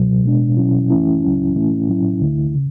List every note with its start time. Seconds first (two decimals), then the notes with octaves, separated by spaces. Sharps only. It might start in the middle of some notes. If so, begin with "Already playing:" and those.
Already playing: C#2 B2 F#3
0.24 B2 G#3 B3 D4
0.57 B2 F#3 C#4 E4
0.90 F#2 E3 A3 C#4 E4
1.23 C#2 C#3 F#3 C#4 E4
1.55 A2 E3 A3 C#4 E4
1.88 A2 F#3 C#4 E4
2.21 D2 D3 A3 E4
2.55 C#3